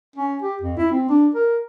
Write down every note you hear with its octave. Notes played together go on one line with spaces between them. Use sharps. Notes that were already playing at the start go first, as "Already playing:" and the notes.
C#4
G4
F2
E4
C4
D4
A#4